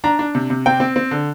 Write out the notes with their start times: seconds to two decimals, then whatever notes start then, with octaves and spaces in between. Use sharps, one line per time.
0.04 D4 A#5
0.19 D4
0.35 C3
0.50 C3
0.66 C4 G5
0.80 C4
0.96 C4
1.11 D3